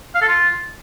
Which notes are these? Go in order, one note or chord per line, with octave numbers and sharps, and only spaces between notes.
F5
A4
F4